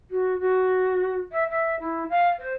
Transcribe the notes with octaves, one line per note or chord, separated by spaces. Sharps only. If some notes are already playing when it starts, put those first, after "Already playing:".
F#4
F#4
E5
E5
E4
F5
C5